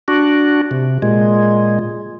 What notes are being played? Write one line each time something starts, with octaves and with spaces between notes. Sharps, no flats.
D4 F#4
C3
A#2 G#3